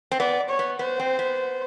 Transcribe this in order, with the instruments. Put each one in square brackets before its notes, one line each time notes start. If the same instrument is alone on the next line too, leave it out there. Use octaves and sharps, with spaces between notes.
[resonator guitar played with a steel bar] C4
[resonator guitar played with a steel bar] B3 [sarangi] D5
[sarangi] C#5
[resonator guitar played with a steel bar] B3
[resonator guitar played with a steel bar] B3 [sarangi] C5
[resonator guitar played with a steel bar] C4
B3